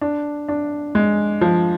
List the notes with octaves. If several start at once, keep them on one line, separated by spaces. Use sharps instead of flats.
D4
D4
G#3
F3